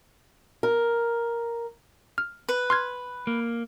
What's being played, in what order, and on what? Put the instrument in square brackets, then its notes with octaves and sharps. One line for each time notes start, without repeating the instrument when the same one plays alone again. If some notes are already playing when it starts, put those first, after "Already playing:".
[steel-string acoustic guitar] A#4
[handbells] F6
[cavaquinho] B4
[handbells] C6 F6 G#6
[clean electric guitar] A#3